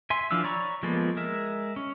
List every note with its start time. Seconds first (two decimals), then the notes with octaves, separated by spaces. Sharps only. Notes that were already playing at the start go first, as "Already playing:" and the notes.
0.10 E5 G#5 C6
0.31 E3 F3 D4 F5 E6
0.44 C#5 D5 A#5 B5 C#6
0.83 F3 G#3 A#3 B3 A4
1.17 G#3 A#4 E5
1.76 C#4